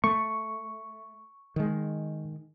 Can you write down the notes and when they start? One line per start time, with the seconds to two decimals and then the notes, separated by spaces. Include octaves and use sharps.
0.04 A3 C#6
1.56 D#3 G#3